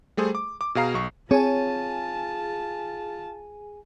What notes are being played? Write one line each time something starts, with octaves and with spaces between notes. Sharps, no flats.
G3 A3 G#4 C5
D6
D6
B2 G#4 F5 A#5 C7
B1 C#6
C4 F4 G#4 C#5 G#5 A5